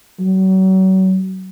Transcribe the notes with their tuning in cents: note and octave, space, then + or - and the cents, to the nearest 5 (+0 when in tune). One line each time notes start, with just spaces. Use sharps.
F#3 +35